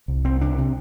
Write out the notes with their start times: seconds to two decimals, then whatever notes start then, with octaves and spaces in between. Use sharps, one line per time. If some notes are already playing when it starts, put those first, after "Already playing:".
0.08 C2
0.25 C2 C4
0.41 C2 D4
0.58 C3